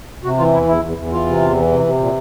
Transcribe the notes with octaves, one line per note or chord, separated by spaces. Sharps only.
C3 F#4
E3 F4
E2 E4
E2 E4
E2
E2
E3 F4
C3
E2
E3
C3
C3
A#2